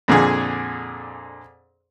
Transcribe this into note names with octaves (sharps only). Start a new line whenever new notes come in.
F2 A#2 D3 G#4